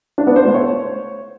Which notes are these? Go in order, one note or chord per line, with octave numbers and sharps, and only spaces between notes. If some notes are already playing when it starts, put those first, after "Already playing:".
D4
B3
C5
A3
C#5